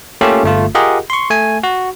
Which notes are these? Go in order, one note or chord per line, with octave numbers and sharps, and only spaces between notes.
A3 A#3 C#4 F4 G4 A4
G1 A3 F4
F4 G4 G#4 A#4 D#5 F#5
C6 C#6
A3 G#5
F#4